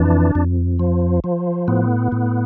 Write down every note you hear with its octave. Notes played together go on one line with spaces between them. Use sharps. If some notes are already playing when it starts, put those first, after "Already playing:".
Already playing: F2 E3 D4
F2
F3
F3
A2 B3
A2